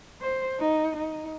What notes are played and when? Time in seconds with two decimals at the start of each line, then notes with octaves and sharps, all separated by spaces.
0.21 C5
0.60 D#4
0.97 D#4